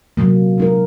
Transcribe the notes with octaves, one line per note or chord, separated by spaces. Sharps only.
C3 F#3 A#3
G#3 D#4 A#4